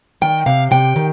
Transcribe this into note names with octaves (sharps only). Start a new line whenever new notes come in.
D#3 G5
C3 F5
C3 G5
D#3